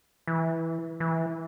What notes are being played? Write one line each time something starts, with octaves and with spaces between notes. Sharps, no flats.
E3
E3